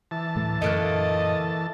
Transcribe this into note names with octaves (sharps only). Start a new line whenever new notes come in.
E3 A5
D2 A2 A3
F#2 A#2 D3 A3 A#3 D#5 F#6